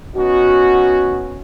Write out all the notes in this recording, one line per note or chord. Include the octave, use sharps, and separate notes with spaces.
B3 C#4 D#4 F#4